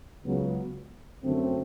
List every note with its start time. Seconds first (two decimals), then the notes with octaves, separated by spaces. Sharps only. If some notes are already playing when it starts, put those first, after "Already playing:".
0.24 C#2 C#3 F#3 B3
1.23 F#2 D3 F#3 A3 C4